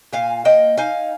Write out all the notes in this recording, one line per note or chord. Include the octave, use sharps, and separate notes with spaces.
A#2 F5 G#5
A#3 D#5 G5
D#4 F5 G#5